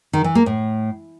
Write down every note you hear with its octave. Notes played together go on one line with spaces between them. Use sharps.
D#3
E3
A#3
A2